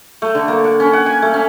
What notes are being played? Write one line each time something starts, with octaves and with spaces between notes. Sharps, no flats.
A3
D3
A#3
F#5
C#4
F#5
G#5
A3
C#4